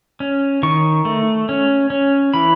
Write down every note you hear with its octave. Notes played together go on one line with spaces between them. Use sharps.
C#4
D#3 C#6
A3
C#4
C#4
E3 B5